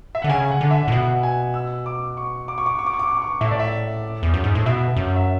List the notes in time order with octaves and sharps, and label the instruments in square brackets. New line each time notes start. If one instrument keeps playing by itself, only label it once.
[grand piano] E5
[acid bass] D3 [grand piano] F#5
[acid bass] C#3 [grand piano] G#5
[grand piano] F#5
[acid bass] D3
[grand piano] E5
[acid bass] A2
[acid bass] B2 [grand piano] F#5
[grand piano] G#5
E6
D6
C#6
D6
C#6
D6
C#6
D6
C#6
D6
C#6
D6
C#6
[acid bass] A2 [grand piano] E5
[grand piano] D5
E5
[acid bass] E2
F#2
G#2
A2
[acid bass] B2 [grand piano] E5
[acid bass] F#2
[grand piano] E5